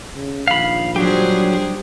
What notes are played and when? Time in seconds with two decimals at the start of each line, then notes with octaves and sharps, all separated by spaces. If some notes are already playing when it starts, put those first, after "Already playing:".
0.16 C#3
0.48 A#1 D#3 F5 B5
0.96 F#3 G3 D4 G4 G#4 C5